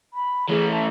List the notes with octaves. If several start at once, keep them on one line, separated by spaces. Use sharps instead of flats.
B5
E3 A3 G#4
A5